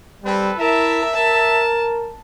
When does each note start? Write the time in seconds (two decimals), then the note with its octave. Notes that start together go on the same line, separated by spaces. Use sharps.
0.24 G3 C4 A4 B4
0.59 E4 A#4 E5 A5
1.14 A#4 A5